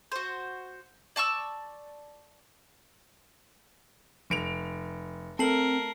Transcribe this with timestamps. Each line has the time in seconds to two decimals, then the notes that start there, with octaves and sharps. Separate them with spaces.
0.12 F#4 C5
1.16 D5 A5 C#6 E6
4.30 F1 D7 F7
5.39 A3 C4 A#4 A5 C7 F#7